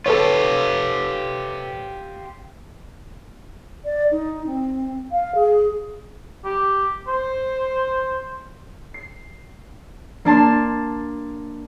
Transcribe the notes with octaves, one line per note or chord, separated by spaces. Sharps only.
F4 G4 A4 B4 C#5
D5
D#4
C4
F5
G#4
G4
C5
C7
A#3 D4 A5 C6